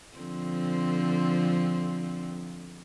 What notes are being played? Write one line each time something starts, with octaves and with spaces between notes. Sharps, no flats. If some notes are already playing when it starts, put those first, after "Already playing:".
D3 F3 C4